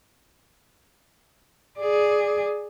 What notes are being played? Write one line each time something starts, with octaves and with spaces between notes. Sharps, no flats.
G#4 D5